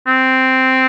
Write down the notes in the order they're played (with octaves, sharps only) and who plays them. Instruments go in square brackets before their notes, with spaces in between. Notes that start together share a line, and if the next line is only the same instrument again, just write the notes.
[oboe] C4